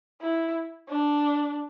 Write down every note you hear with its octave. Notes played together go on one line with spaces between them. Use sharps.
E4
D4